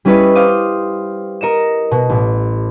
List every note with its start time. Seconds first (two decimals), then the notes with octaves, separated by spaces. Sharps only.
0.05 G3 C#4 E4 B4 C#5 D#5
0.35 C5 F5 D6 D#6
1.41 A#4 D#5 C#7 E7
1.91 B2
2.09 A1